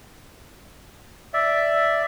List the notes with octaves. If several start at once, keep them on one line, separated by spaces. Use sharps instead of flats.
D5 E5